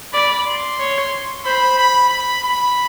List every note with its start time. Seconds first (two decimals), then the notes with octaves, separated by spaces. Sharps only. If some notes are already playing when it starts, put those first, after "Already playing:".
0.13 D5 B5
0.46 C6
0.79 C#5
1.45 C5 B5
1.78 B5
2.10 B5
2.44 B5